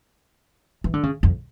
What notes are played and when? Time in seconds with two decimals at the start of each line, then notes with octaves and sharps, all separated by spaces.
0.84 E3
0.94 D3
1.03 C#3
1.23 F2